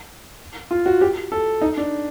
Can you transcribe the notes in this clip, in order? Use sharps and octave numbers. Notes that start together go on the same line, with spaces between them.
F4
F#4
G4
A4
D#4
D4